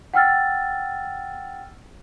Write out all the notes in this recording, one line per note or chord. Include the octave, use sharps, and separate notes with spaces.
F#5 G5 E6 F6 A6